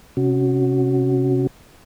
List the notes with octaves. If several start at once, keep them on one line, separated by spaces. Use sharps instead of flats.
C3 C#4 F#4